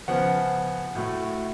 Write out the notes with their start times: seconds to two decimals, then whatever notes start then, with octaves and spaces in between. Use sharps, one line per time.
0.08 C#3 F3 B3 F#5
0.95 A2 F#3 A3